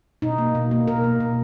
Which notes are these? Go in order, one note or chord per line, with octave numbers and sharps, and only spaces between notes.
B2 D#4
A#3
B2
A#3
B2 A#4
A#3
B2